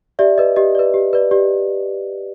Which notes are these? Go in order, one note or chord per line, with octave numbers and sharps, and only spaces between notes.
G4 D5 E5
B4 D5 D#5
G4 D#5
B4 D5
G4
B4 D5
G4 D5